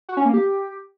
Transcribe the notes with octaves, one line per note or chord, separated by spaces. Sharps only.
F#4
C#4
A#3
G4